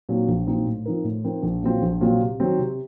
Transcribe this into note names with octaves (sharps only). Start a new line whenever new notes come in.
A#2 F#3 C4 D#4
A#1
A#2 F#3 C4 D#4
A2
F3 C4 D#4 A#4
A2
F3 C4 D#4 A#4
A#1
A#2 F#3 C4 F4
A#1
A#2 F#3 C4 F4
C3
D#3 F#3 C4
C3